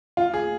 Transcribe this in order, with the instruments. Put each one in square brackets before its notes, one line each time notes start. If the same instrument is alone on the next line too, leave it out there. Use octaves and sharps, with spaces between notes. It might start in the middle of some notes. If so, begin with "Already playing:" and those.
[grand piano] F4
G#4